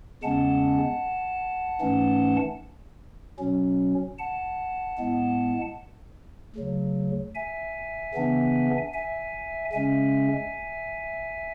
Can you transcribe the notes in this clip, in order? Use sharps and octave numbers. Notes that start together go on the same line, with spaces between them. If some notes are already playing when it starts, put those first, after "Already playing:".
E2 C#3 G#3 C#4 F#5 A5
G#2 E3 A3 C#4
B2 F#3 C#4
F#5 A5
A2 G#3 B3
D2 C#3 F#3
E5 G#5
C#3 E3 B3 D4
E5 G#5
C#3 G#3 C#4 E5 G#5